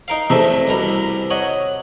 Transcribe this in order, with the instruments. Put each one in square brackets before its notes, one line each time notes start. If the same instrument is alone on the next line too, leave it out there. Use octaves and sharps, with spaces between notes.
[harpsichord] D#4 A#4 F5
[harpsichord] E2 A3 E5 [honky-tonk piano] C3
[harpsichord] C2 B2 A#5
C#5 D#5 F#5